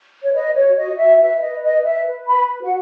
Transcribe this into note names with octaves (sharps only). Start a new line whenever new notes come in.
C#5
B4 D#5
C#5
F#4
D#5
F#4
E5
B4 E5
E5
D#5
B4
D#5
B4
E5
B4
B5
B4
F#4 F#5